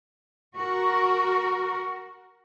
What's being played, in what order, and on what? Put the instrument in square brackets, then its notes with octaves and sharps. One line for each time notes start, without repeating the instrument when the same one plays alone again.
[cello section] F#4 A#4